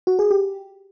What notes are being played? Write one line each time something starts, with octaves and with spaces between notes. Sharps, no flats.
F#4
G#4
G4